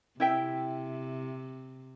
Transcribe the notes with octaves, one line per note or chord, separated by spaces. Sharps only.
C3 E4 E5 G5